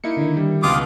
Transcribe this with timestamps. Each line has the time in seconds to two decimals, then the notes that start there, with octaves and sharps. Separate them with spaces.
0.04 A#3 D#4 E4 C#7
0.17 D3 D#3
0.37 G3
0.63 C#2 B2 F4 D6 D#6